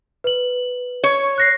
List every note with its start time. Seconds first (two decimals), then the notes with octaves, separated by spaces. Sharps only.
0.24 B4 F#7
1.04 C#5
1.38 F#6 A#6 C7